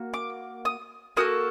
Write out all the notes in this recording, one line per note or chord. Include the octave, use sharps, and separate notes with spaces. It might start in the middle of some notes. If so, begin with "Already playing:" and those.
Already playing: A#3 F#4
D6
D#6
A#3 F#4 A4 D#6